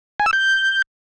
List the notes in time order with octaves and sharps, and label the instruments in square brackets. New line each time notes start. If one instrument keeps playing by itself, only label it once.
[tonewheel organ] G#5
E6
G6